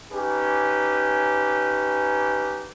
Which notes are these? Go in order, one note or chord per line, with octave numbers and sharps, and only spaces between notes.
C#4 D#4 G4 B4 G#5